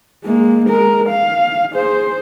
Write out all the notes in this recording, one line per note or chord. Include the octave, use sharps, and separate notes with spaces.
G#3 A#3
G#3 A#4
F5
G#4 C5